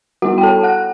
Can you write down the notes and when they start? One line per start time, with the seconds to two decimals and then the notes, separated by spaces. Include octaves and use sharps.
0.22 G3 B3 E4 F#4 F#5
0.38 G5
0.43 A4 A5
0.63 F#5 F#6